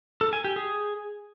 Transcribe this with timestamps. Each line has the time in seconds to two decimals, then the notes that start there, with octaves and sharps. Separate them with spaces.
0.21 A4
0.33 G#5
0.44 G4
0.56 G#4